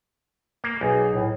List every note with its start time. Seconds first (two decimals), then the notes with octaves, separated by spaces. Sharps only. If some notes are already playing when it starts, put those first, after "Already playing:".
0.64 A#3
0.81 B1 G#4
1.14 A2